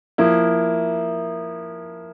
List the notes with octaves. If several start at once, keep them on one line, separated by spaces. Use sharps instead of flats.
F3 A#3 E4